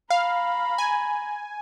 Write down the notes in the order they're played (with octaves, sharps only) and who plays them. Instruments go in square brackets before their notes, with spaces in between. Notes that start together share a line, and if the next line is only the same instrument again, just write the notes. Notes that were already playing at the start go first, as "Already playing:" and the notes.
[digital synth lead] F5 [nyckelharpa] A#5 B5
[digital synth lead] G#5